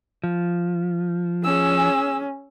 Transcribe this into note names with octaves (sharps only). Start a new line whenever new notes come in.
F3
C#4 G#4 E6